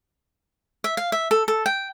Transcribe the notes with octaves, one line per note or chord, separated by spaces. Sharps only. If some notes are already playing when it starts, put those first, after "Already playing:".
E5
F5
E5
A4
A4
G5